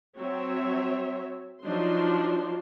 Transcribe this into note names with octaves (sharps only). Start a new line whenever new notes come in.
F#3 C4 C#5 E5
F3 F#3 D4 D#4 C6